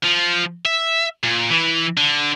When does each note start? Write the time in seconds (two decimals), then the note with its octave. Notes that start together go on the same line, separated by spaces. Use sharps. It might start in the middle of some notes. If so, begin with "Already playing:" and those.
0.04 F3
0.65 E5
1.23 A#2
1.50 E3
1.97 D3